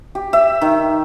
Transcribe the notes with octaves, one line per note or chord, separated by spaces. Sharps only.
G4
E5
D#3